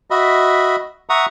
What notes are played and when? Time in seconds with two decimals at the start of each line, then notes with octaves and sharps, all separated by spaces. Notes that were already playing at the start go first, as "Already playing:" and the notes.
0.11 F#4 D#5 E5 B5
1.10 E5 F#5 A#5 C#6 D#6